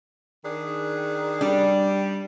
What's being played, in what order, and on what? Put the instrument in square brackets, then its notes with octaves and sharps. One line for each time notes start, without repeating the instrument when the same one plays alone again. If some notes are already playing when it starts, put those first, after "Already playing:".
[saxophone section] D#3 D4 G#4
[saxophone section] G3 [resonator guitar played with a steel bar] D4